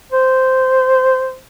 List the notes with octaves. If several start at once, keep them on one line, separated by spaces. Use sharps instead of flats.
C5